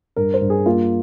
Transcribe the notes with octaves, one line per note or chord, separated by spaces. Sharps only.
G2 A#4
C5
G2
G#4
A#3 F4